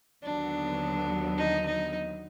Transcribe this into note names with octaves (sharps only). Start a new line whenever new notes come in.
D#2 D3 F#3 B3 D4
D#4
D#4